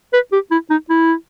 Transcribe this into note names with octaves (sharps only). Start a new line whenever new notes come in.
B4
G4
E4
D#4
E4